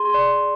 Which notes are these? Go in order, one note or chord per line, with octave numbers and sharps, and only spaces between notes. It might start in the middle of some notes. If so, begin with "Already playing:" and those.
Already playing: G#4 C6
D5